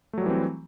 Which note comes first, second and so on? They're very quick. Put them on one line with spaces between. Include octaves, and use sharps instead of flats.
A3 F#3 G3 E3 C4